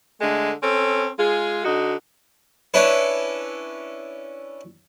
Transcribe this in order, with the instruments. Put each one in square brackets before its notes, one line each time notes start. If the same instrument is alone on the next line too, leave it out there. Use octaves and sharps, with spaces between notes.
[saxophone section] D3 G#3 A3
C4 C#4 A4
G#3 F4 G#4
D3 D#4 F#4
[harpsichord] C#4 D4 E4 B4